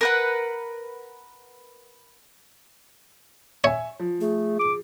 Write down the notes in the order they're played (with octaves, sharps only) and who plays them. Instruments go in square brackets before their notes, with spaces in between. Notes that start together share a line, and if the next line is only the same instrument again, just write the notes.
[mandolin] A#4 B4 F#5
[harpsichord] C#5 [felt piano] E5 G#5
[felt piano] F3
[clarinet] A3 [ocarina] G#4
[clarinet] D6